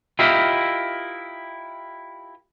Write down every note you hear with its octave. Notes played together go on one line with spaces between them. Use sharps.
E4 F4 G4 A#4 D#5 E5